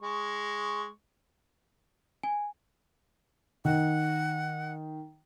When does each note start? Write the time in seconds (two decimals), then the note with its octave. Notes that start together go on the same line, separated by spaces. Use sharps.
0.02 G#3 C#6
2.23 G#5
3.65 D#3 F#5